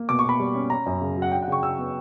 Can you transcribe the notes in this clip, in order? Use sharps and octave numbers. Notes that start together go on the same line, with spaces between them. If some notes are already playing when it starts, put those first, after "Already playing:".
Already playing: A#3
B2 D6
C#6
B2 B5
G3
C#4
C#4 A#5
F#2
C#3
F#3 F#5
D4 G5
F#5
C#3 C#6
F#3 E6
B3